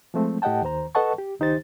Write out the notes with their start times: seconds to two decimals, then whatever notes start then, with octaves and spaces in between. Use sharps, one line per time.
0.14 F3 G#3 A3 C4
0.42 A2 G4 D#5 F#5 G5 A5
0.62 D#2 D#3 C5 A#5
0.95 A4 B4 D#5 F#5 A5 C#6
1.18 G4
1.39 C#2 D#3 D#4 G4 C5 A6